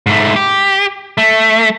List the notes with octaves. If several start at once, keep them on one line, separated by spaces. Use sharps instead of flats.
G#2 A3
G4
A3